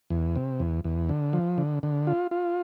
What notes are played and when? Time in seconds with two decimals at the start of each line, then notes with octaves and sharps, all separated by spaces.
0.10 E2
0.36 C3
0.60 E2
0.84 E2
1.09 D3
1.33 F3
1.58 D3
1.83 D3
2.07 F4
2.31 F4